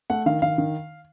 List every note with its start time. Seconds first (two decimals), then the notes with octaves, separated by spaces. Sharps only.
0.10 A3 F#5
0.26 D#3 F5
0.42 D#3 F5
0.58 D#3